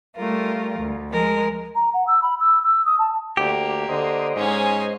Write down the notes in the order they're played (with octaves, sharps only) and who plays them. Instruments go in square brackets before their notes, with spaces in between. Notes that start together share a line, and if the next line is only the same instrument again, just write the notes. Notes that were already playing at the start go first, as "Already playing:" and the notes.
[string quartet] G3 A3 F4 A#4
D2
F3 G#3 A#4
[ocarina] A#5
F#5
E6
B5
E6
E6
D#6
A5
[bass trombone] D2 [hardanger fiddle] A#3 [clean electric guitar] G4
[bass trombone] D3 [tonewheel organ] C5 D#5
[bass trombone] G#2 [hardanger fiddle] C#4 G#5